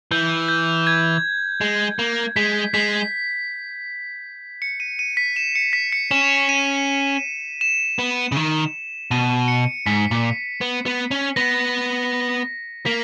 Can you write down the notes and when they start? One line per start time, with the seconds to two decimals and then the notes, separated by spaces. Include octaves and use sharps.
0.11 E3 G6
0.48 G6
0.87 G#6
1.61 G#3
1.99 A#3
2.36 G#3 B6
2.74 G#3 B6
4.62 C#7
4.80 D#7
4.99 D#7
5.17 B6
5.36 E7
5.55 C#7
5.73 B6
5.92 C#7
6.11 C#4 E7
6.49 D#7
7.61 E7
7.99 B3
8.32 C#3
8.36 D#3
9.11 B2 D#7
9.48 C#7
9.86 G#2 B6
10.11 A#2
10.61 B3
10.86 B3
11.11 C#4
11.36 B3 A#6
12.86 A#3 B6